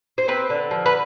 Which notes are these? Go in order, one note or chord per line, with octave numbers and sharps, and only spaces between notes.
C5
C4 B4
D3
F3
B4